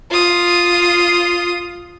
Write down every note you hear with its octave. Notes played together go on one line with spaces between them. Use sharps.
F4 D#6